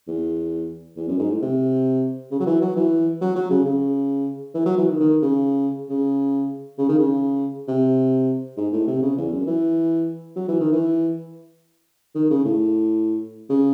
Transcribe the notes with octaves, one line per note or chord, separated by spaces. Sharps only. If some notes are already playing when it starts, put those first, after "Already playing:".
E2
E2
F#2
G#2
A2
C3
C#3
F#3
E3
F#3
E3
F#3
F#3
C#3
C#3
E3
F#3
E3
D#3
D#3
C#3
C#3
C#3
D#3
C#3
C3
G#2
A2
C3
C#3
E2
F#2
E3
F#3
E3
D#3
E3
D#3
C#3
A2
C#3